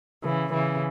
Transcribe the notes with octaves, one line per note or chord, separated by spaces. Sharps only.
C#3 E3
C#3 E3